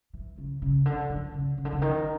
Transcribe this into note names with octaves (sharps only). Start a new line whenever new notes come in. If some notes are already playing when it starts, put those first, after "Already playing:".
E3
C#3
C#3
D3
D3
C#3
C#3
D3
C#3
D#3